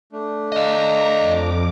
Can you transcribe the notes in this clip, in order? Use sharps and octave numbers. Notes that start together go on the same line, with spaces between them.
A3 D4
D#5 F5 A#5
F2 D6